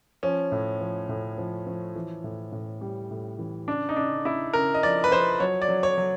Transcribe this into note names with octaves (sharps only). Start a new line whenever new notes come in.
F3 C#4
A2
F3
A2
F3
F3
E3
A2
A2
G3
A2
E3
C#3 D4
D#4
C#3 D4
C#3 E4
C#3 A#4
D#5
F3 D5
B4
F3 C5
F#3 C#5
D5
F#3
C#5
F#3